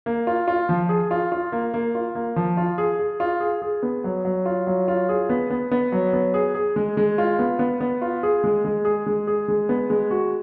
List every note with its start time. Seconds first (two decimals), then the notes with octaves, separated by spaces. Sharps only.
0.06 A#3
0.27 F4
0.48 F4
0.69 F3
0.89 G#4
1.11 F4
1.32 F4
1.52 A#3
1.74 A#3
1.95 F4
2.15 A#3
2.36 F3
2.57 F4
2.78 G#4
2.99 G#4
3.20 F4
3.40 G#4
3.62 G#4
3.83 B3
4.04 F#3
4.25 F#3
4.45 F4
4.67 F#3
4.88 F4
5.09 G#4
5.29 B3
5.50 B3
5.71 B3
5.92 F#3
6.13 B3
6.34 G#4
6.54 G#4
6.76 G#3
6.97 G#3
7.18 F4
7.39 B3
7.59 B3
7.81 B3
8.02 F4
8.23 G#4
8.44 G#3
8.65 G#3
8.85 G#4
9.07 G#3
9.27 G#4
9.48 G#3
9.69 B3
9.90 G#3
10.11 F#4